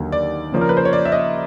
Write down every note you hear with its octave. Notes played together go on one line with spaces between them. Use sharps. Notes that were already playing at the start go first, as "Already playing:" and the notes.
Already playing: D#2 D3 F#3 A#3
D5
C#3 F3 A#3 C#4
A#4
B4
C5
C#5
D5
E5
D#5